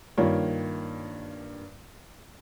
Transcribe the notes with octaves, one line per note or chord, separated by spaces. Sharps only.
G2 D#3 A#3 F4 C#5